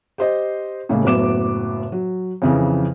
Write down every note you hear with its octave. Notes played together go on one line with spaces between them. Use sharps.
G4 C5 D#5
A2 C#3 G#3 A#3
F#1 A2 F#3 B3 D6 E7
F#3
F2 C#3 E3